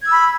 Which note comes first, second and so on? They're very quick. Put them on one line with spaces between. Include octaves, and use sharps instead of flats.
G#6 E6 B5